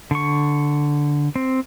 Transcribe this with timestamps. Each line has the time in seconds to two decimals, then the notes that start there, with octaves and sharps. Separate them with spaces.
0.11 D3 C#6
1.36 C4